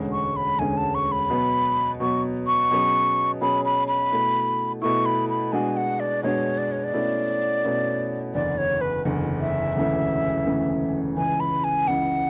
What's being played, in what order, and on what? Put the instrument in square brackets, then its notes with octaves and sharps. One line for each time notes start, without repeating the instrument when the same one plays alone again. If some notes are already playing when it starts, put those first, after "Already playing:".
Already playing: [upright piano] E1 D2 D3 G#3 C#4
[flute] C#6
B5
[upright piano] E1 D2 D3 G#3 C#4 [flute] G#5
[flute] A5
C#6
B5
[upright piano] B2 F#3 B3
[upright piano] B2 F#3 B3 [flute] C#6
[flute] C#6
[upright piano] B2 F#3 C#4 G#4
[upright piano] B2 F#3 C#4 G#4 [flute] B5
[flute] B5
B5
[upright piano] B2 A3 E4
[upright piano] B2 A3 E4 [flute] C#6
[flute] B5
B5
[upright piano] B2 G#3 D4 F#4 [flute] G#5
[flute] F#5
D5
[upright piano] B2 G#3 D4 F#4 [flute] C#5
[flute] D5
C#5
D5
[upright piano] B2 A3 C#4 E4
B2 A3 C#4 E4
[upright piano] F#1 E2 D3 [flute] D5
[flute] C#5
B4
[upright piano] F#1 E2 D3
[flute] E5
[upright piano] E1 D2 C#3 E3 A3
E1 D2 C#3 E3 A3
[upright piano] C#2 C#3 E3 [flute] G#5
[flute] B5
G#5
[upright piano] C#2 C#3 E3 [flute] F#5